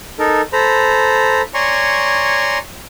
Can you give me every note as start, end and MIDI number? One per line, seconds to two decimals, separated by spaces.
0.19 0.41 63
0.19 0.41 69
0.19 0.41 70
0.53 1.41 69
0.53 1.41 72
0.53 1.41 82
0.53 1.41 83
1.54 2.58 73
1.54 2.58 74
1.54 2.58 80
1.54 2.58 82
1.54 2.58 84
1.54 2.58 85